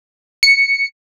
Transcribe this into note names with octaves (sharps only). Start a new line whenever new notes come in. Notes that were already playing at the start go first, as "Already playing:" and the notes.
C#7